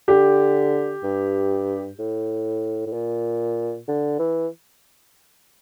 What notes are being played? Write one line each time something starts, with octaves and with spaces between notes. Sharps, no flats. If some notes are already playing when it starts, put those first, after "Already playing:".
D3 G4
G2
A2
A2
A#2
D3
E3